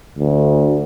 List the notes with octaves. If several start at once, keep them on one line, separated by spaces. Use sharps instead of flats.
D2